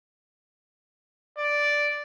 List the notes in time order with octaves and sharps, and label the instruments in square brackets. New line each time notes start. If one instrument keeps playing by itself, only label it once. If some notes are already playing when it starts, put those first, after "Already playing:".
[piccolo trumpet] D5